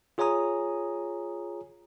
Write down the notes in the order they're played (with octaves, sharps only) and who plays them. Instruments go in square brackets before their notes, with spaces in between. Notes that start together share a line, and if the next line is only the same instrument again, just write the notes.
[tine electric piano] F4 G#4 C#5 G#5 A#5 D#6